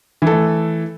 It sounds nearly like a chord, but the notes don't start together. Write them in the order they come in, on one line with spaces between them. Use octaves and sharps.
E3 A4 A3